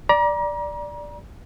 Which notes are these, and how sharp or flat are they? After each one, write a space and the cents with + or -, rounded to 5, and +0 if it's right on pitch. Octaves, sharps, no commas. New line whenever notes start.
D5 +0 A#5 +35